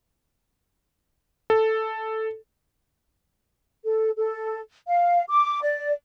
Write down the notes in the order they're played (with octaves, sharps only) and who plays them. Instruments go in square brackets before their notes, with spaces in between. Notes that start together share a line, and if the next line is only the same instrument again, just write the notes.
[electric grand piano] A4
[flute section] A4
A4
F5
D6
D5